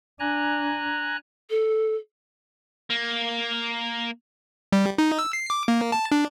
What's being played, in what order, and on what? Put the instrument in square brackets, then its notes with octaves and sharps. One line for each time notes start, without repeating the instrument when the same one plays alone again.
[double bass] D4 [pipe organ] G#5 A#5 F#6
[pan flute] A4
[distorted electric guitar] A#3
[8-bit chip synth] G3
D#4
E6
C7
D6
A#3
A5
D4